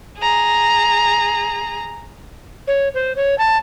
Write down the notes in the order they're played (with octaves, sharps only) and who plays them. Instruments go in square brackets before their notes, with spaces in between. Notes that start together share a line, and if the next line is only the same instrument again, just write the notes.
[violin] G#4 A#5
[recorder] C#5
C5
C#5
A5